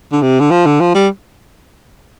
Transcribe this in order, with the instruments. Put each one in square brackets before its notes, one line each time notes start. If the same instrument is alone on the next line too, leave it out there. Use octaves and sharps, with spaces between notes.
[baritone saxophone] D3
C3
D3
F3
D3
F3
G3